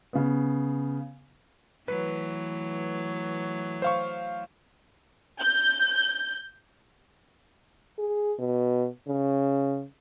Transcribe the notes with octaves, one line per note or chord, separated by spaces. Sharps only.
C#3 B3
E3 F#3 A3 B4
C5 F5 C#6
G6
G#4
B2
C#3